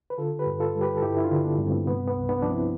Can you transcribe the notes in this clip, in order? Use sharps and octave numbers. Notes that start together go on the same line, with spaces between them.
B4
D3 F4 A4
G4 B4
G2
F4 A4
G3
G4 B4
A4
G2 E4 G4
E4
D4 F4
D3
B3 D4
G2
A3 C4
C3 B3
B3
C2
B3 D4
F3 D4
C4 E4